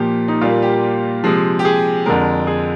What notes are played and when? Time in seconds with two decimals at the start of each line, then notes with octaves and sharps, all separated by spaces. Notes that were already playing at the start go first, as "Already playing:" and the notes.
Already playing: A#2 F3 A#3 G4
0.28 D#4
0.41 A#2 G3 A#3 F4
0.62 G4
1.24 C3 F3 G#3
1.59 G4
1.65 G#4
2.06 F2 D3 G#3 A#4
2.47 G#4